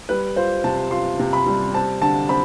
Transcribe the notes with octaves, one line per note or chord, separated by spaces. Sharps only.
G3 B4
F4 C5
C3 A5
F4 C6
C3
B5
G3
C4 A5
D3 A5
C4 B5